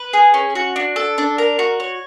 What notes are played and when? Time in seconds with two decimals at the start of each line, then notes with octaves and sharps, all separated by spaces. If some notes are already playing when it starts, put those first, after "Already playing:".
Already playing: B4
0.13 G#4
0.34 C#4
0.55 F#4
0.76 D4
0.96 A4
1.18 D4
1.38 A#4
1.59 F#4
1.80 C#5